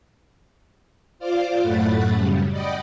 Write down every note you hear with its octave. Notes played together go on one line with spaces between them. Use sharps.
F4 C5 D5 F5 D6
F#2 A2 A3 F#5 B5 A6
F#2 C#3 G3
D5 D#5 F#5 G5 B5